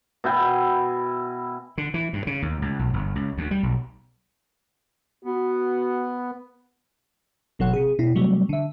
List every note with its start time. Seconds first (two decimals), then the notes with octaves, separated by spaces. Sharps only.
0.24 B2 E4 G5 G#5
1.78 D3
1.94 E3
2.13 G2
2.27 C#3
2.42 D#2
2.62 C#2
2.79 B1
2.93 G1
3.15 C#2
3.38 D2
3.51 G3
3.63 B1
5.25 B3 F#4
7.59 G#1 B2 F#3 A4 C#5 F#5
7.73 C3 G#4
7.99 B2 E4
8.15 C3 F#3 G3 A3
8.49 D3 E5